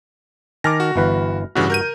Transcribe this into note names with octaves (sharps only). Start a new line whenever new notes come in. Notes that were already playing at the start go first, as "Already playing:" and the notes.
D#3 G#5 A5 D6 F6 A#6
F#4
G1 E3 B4
A1 G2 C#3 E3 F#4
A#4 G6 D#7